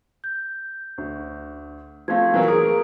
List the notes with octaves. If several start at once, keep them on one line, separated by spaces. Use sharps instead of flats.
G6
D2
F3 A3 C4 F5 G#6
E3 F#3 A#3
G#4 A#4 D#6